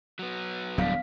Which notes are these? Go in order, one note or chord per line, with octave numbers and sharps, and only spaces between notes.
F#3 B3
D1 E2 F#3 G3 B3 D4 F5 B6